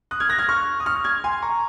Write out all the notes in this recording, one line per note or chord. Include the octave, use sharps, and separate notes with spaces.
D#6 F#6
F6 G#6
F#6 A#6
F6 G#6
C#6 F6
D#6
C#6 F6
F6 G#6
G#5 C6
A#5 C#6